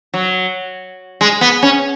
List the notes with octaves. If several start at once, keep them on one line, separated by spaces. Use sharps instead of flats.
F#3
G#3
B3
C#4